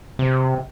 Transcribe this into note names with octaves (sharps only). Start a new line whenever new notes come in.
C3